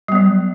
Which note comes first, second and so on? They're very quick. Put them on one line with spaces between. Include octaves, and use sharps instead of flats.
G3 B3 F#3